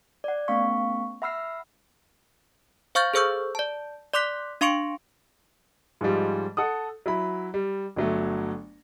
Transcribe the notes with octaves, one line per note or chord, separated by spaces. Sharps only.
D5 F#5
A3 B3 C#4 F5 C#6
E5 F#5 B5 E6 F6 C7
C5 F5 C#6 F6 G6 A6
G#4 A4 C5 C#6 E6 G6
D5 A5
D5 C6 D6 F#6 B6
D4 F5 C6 C#6 C#7 D7
G#2 F3 G3
A4 F#5 D#6
F#3 E4 B5
G3
G1 F#3 A3